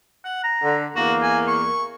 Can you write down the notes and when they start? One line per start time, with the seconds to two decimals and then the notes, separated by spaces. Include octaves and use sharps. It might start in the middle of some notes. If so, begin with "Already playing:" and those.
0.24 F#5
0.43 A#5
0.63 D3
0.96 E2 A#3 F#4
1.22 G#5
1.48 C#6